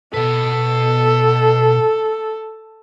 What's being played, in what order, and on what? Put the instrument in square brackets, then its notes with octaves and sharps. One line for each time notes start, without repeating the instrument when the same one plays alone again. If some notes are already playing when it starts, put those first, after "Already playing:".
[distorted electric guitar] B2 B4 [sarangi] A4